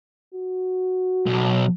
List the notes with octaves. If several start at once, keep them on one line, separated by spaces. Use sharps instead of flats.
F#4
B1